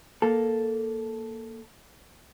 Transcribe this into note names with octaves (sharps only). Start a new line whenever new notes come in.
A#3 A4